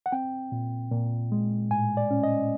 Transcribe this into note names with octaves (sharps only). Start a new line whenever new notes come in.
F#5
C4 G5
A#2
A#2
G#3
A2 G#5
D5
C#4
D#5